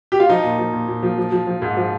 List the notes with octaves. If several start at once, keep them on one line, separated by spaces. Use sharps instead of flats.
G4
F4
F3 D#4
A#2
F3
A#2
A#2
F3
F3
F3
F3
G#2
F3